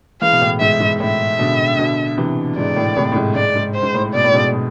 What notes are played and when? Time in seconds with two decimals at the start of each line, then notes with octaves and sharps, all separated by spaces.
0.21 E3 G#3 F5
0.33 B2
0.41 A2
0.60 G#2 E5
0.80 G#2
1.00 A2 E5
1.39 B2 D3
1.78 B2 D3
2.18 C3 E3
2.57 G#2 D5
2.76 A2
2.97 A2 C3
3.12 A2
3.16 G#2
3.35 G#2 D5
3.56 G#2
3.75 C5
3.83 G#2
3.94 A2
4.14 B2 D5
4.24 A2
4.34 G#2 B2
4.53 B2